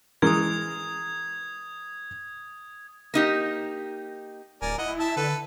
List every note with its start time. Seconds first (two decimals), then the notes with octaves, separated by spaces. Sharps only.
0.22 E3 G#3 A#4 D#6 G#6
3.14 A#3 D#4 G4
4.62 D1 A#4 D5 G#5
4.78 E4 D#5 F#5
5.00 E5 A5
5.17 D3 A4 B4